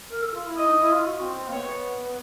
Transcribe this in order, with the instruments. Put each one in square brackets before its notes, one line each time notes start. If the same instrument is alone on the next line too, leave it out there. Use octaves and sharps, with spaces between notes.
[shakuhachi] A#4
A4
F4
E4
[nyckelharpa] D#5
[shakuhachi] D#4
E4
F4
F#4
C4
C4
A#3
[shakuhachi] B3 [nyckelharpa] C#5